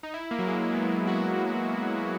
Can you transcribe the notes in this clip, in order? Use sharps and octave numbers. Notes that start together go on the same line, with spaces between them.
D#4
E4
A#3
F#3
G#3
G#3
B3
A#3
F#4
E4